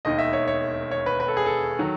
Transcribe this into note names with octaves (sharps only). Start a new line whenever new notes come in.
E1 D#2 D#3 D#5
E5
C#5
C#5
C#5
B4
B4
A4
G#4
A4
D#3 F#3